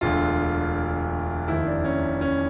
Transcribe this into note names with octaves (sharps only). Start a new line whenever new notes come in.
E1 D2 D3 F4
F1 D#2 D#3 E4
D4
C#4
C#4